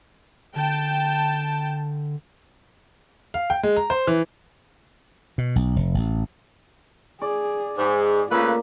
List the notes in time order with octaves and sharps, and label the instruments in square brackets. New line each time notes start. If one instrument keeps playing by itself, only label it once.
[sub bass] D3 [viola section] G5 A5
[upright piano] F5
G5
G#3
A#5
C5
E3
[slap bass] B2
B1
F1
A1
[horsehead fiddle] G#4 [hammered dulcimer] D5
[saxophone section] G#2 [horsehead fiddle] G#4
[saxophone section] C#3 A3 B4 [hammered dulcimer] A#3 [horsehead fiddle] F4